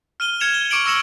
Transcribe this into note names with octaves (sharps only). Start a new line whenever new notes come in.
F6 D#7 G7
F6 G#6 C#7 E7 F7
G7
C#6 D6 C#7 D7 F#7
C#6 E6 A#6 C#7 E7 F#7